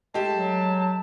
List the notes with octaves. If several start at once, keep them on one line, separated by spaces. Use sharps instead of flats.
G#3 A3 G4 A5
F#3